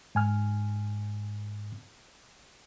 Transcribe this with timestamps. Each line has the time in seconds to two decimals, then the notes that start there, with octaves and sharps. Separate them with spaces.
0.15 G#2 G#5 F6